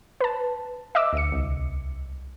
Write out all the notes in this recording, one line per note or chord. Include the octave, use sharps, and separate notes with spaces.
B4 A5
D#5 E5 D6 E6
D2 C#7
C2